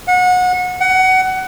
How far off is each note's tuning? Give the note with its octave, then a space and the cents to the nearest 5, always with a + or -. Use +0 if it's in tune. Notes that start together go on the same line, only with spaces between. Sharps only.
F#5 -30
F#5 +20